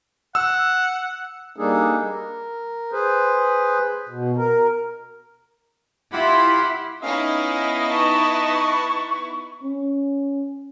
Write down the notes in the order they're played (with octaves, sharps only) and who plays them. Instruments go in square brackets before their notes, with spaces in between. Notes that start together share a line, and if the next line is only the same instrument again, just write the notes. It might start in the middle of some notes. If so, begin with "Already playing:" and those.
[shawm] F#5 [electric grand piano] E6
[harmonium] G3 A#3 D4 D#4 G#4 A4
A#4
G#4 B4 C5
B2
A#4
[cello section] E4 [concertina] F4 G4 F#5 [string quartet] B5 C6
[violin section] B3 D#4 E4 [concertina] C#4 F5 [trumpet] D#5
[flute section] B4 C#6 [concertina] A5
[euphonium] C#4